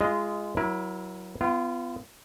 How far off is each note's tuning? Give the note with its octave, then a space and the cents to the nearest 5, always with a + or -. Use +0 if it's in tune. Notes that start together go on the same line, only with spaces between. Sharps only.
G#3 -5 F4 -30 D#5 +0
F#3 +0 E4 +0 A#4 +35
B3 +30 F4 -25